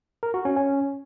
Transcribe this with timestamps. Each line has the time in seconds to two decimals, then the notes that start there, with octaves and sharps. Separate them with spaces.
0.23 A#4
0.34 F#4
0.45 C#4
0.56 C#4